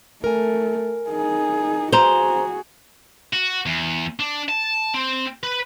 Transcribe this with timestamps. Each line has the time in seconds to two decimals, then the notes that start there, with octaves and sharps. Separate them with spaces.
0.24 A3 A#4 G#5
1.10 D#4 G#4
1.93 F#4 G#4 C5 A#5 F7 G7
3.34 F#4
3.66 E2
4.19 D4
4.49 A5
4.94 C4
5.44 B4